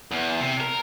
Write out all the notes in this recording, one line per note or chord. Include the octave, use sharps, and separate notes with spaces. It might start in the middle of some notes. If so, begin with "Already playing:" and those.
E2
C3
A#4